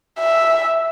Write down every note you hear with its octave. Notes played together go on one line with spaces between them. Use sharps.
E5